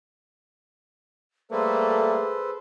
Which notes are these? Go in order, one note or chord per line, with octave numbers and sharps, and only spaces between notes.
G3 A3 A#3 G#4 A4 B4 C5